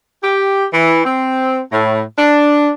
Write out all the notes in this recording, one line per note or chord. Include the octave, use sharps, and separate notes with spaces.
G4
E3
C4
A2
D4